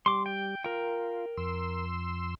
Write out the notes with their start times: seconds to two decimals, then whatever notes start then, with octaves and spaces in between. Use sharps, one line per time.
0.06 G3 C6 D6
0.26 G5
0.64 F4 A#4 G5
1.37 F2 C6 E6